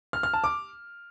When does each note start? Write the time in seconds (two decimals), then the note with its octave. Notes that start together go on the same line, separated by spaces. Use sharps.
0.13 F6
0.23 F6
0.33 A5
0.44 D6